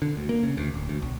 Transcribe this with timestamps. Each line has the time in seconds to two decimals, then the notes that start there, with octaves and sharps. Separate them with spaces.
0.02 D3
0.17 D2
0.29 A#3
0.43 C#3
0.57 D2
0.74 D1
0.89 D2
1.02 B1